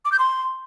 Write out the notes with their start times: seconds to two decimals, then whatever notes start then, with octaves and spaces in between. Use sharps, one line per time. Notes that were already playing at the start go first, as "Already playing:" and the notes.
0.05 D6
0.12 G6
0.19 C6